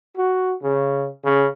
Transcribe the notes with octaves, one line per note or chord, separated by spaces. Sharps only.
F#4
C#3
C#3